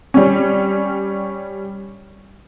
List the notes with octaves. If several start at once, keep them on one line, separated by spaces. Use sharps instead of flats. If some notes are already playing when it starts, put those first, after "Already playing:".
G3 C#4